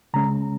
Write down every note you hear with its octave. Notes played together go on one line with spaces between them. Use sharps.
C#3 G#3 C#4 A#5